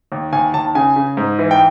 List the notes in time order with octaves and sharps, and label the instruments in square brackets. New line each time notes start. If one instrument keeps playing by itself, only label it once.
[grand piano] D#2
D#2 G#5
D#2 A5
C#3 G#5
C#3
G#2
E3
G5